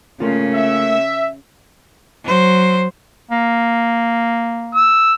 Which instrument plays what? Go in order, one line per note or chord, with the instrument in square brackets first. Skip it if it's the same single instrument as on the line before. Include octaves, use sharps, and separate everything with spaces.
[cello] C#3 [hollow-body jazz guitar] A3 A#3 F4
[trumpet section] E5
[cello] F#3 C5
[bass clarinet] A#3
[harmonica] E6